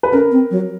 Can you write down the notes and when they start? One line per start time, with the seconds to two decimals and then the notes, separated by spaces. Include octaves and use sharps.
0.03 B4
0.12 C#4 A#4
0.32 C4
0.51 F#3